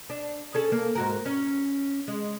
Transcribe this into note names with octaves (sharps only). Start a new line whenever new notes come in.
D4
C#4 G#4 A4
A#3
G#2 F#4 A#4
C#4
G#3